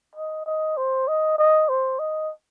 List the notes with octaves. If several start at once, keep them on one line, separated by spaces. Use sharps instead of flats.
D#5
D#5
C5
D#5
D#5
C5
D#5